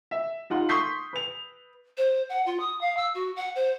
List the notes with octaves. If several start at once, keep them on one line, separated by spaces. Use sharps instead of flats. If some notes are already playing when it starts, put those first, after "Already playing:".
E5
D#4 F4 F#5 C6
C6 C#6 D#6 G6 B6 C7
B4 F7
C5
F#5
F4
D#6
F5
E6
F#4
F#5
C5